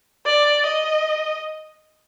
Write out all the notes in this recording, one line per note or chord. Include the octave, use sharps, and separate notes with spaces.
D5
D#5